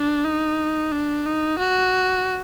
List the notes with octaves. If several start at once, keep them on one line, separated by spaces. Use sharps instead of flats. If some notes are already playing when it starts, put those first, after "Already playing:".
Already playing: D4
D#4
D4
D#4
F#4